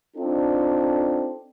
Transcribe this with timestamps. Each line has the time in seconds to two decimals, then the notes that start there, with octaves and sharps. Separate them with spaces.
0.17 C4 D4 D#4 F4 A4